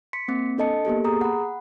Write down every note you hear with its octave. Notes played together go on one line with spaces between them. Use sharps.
C6 B6 C#7
A#3 C4
D4 A4 D#5 A5 C#7
A#3 B3 G4 A4
G#4 A#5 D#6
F#5 B5